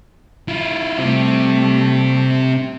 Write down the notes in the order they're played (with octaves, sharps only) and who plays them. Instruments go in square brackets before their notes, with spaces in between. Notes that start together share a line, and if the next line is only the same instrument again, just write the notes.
[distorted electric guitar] E4 F4
[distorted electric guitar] C3 C4 [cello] G3 A3